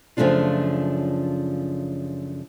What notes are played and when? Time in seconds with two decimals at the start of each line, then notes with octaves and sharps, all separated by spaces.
0.17 F#2 C#3 F3 A3 D4 F4